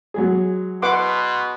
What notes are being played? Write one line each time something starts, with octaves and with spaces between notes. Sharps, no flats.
F#3 G#3 G#4
B2 B4 F#5 C6 D6